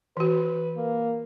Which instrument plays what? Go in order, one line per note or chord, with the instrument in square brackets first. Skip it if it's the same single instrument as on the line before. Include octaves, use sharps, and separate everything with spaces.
[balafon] E3 F#4 [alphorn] B4
[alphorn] A#3